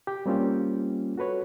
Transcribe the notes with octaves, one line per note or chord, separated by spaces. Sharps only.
G4 G5
G3 A#3 C4 C#4 F4 G4
F#4 A4 B4 C#5